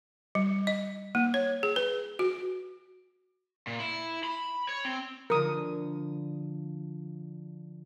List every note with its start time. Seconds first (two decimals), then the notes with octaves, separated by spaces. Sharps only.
0.35 G3
0.67 D#5
1.15 A#3
1.34 C#5
1.63 G#4
1.76 B4
2.19 F#4
3.67 A#2
3.80 E4
4.24 B5
4.69 C#5
4.85 C4
5.30 D3 F3 A#4 D#6